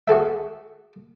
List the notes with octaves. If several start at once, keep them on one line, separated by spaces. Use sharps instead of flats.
F#4 G#4 A4 E5